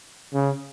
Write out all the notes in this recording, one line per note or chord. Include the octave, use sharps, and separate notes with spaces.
C#3